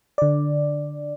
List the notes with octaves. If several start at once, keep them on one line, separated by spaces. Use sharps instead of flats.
D3 D5